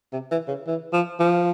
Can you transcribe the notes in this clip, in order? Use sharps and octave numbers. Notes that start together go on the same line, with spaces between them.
C3
E3
C#3
E3
F3
F3